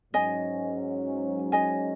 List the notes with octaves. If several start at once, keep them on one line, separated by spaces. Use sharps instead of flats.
G#2 F#3 C#4 D#5 G#5
D#5 G#5